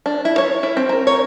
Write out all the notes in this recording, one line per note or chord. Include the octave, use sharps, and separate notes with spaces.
D4
E4
C#5
E4
C4
A#4
C#5